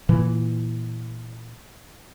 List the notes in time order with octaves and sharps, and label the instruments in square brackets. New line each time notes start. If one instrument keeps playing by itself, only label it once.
[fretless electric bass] A#2 E3